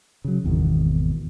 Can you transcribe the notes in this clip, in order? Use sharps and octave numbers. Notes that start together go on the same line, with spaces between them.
C#3 F#3
G#1 E2 B2 D#3